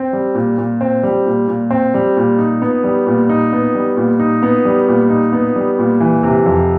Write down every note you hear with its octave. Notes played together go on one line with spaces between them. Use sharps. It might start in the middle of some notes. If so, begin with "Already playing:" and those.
Already playing: C4
G3
A#2
A#2
C4
G3
A#2
A#2
C4
G3
A#2
D#4
B3
G3
A#2
D#4
B3
G3
A#2
D#4
B3
G3
A#2
D#4
B3
G3
A#2
E3
C3
F2